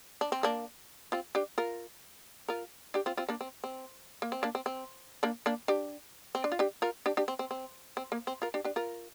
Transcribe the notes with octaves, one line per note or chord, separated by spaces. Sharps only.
D4
C4
A#3 D4
C4 F4
D4 G4
F4 A#4
F4 A#4
D4 G4
C4 F4
C4 F4
A#3 D4
C4
C4
A#3
C4
A#3 D4
C4
C4
A#3 D4
A#3 D4
D4 G4
C4
D4
F4
D4 G4
F4 A#4
D4 G4
D4 G4
C4
C4
C4
C4
A#3
C4
F4 A#4
D4 G4
D4 G4
F4 A#4